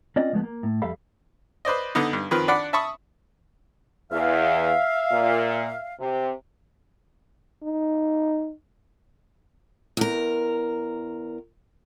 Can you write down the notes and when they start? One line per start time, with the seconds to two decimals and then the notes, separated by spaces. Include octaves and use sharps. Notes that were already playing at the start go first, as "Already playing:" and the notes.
0.16 C4 C#4 F4 D5 D#5
0.32 C#2 F3 G#3 A3 B3
0.44 A#3
0.63 A2
0.82 F2 G3 A4 E5 F5 B5
1.65 B4 C5 D5 D#5
1.95 D3 B3 D#4
2.13 G2
2.31 D#3 F3 C4 B4
2.48 D4 D5 F#5 B5
2.73 E5 A5 B5 C#6 D#6
4.12 E2 E5 F5
5.12 A#2
6.00 C3
7.63 D#4
9.97 E2 A#4